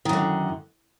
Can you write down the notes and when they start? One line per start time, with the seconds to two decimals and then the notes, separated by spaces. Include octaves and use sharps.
0.05 D#3
0.09 F#2
0.13 D3